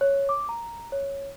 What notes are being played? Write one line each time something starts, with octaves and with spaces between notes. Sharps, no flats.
C#5
D6
A#5
C#5